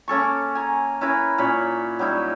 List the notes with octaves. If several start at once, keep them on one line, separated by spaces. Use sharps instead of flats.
A#3 C#4 A4 C#6
G#5 A#5
C#4 E4 A#4 B4
A#2 C#4 C#5 B5
F#3 G3 D#4 E4